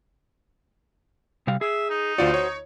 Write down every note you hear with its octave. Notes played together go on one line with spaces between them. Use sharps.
C3 G3 F5
G#4 E5
D#4
D2 F4 F#4 C5 D5
C#5